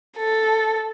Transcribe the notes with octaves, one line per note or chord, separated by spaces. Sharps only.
A4